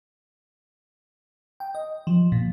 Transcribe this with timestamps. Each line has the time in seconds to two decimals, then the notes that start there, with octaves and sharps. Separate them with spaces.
1.60 G5
1.75 D#5
2.07 F3
2.32 A#2